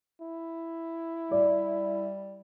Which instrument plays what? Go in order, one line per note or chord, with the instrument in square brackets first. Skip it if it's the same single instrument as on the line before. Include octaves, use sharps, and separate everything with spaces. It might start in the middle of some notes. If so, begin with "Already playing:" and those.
[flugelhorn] E4
[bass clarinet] G3 [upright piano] D5